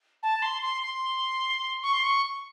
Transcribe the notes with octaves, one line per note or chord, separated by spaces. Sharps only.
A5
C6
C6
C6
C#6
C6
C#6